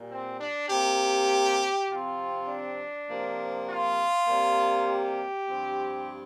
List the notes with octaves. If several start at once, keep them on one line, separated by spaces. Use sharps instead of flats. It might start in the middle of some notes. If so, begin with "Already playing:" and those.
Already playing: A#2 G3
C4
D4
C3 A#3 G4
C3 F3 C4 F4
D4
C3 F3 A#3
F4
C3 G3 A#3
G4
G2 F3 C4